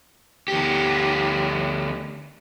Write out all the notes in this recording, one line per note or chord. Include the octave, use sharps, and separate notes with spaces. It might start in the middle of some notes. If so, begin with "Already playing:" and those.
D2 G4